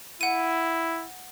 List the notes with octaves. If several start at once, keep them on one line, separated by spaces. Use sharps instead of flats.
E4 F#5 D#7